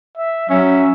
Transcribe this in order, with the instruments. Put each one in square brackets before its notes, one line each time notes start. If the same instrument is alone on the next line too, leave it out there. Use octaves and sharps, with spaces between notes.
[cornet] E5
[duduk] F#3 [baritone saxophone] C#4 [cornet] E5